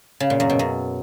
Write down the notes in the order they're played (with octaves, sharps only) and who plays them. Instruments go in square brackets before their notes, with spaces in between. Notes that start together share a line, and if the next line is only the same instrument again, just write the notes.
[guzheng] C#3
A#2
F#2
B2
F#2